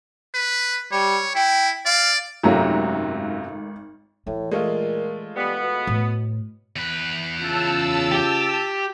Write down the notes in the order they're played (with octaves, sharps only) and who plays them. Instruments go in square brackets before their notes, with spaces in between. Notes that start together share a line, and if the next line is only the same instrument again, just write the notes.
[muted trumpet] B4
[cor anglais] G3 [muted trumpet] C#5
[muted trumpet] E4 [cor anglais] G5
[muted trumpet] D5 [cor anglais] F5
[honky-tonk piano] G#1 A#5 [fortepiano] F#2 C3 F#3 [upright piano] A3 F4
[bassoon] A2 [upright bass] E3
[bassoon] A#2 [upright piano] G#3 A3 F4
[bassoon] G3 [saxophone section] B3
[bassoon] B2
[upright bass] A2
[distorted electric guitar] E2 B4
[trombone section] C#3 F4 [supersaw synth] A5 E6
[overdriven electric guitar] G4